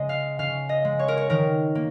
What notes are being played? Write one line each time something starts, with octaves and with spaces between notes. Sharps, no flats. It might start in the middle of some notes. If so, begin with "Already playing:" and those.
Already playing: C#3 G#3 D#5
F5
C#3 F5
D#5
G#3
C#5
A#4
C#5
D#3 A#4
A#3